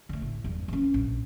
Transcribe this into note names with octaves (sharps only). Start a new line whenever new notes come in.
D3 A3
A2
E2 G2
E3 C#4
A#1